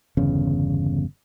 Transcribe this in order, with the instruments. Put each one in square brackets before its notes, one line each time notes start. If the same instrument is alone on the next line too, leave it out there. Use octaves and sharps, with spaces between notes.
[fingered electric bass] G1 E2 C#3